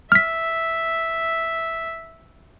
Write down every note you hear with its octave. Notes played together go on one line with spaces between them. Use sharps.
E5 F6 B6